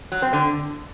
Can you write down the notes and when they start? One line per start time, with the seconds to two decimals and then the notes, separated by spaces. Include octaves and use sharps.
0.12 F#3
0.22 C4
0.33 D3